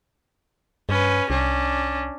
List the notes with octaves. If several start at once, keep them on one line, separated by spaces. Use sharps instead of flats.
G2 C#4 B4
C2 C#4 D4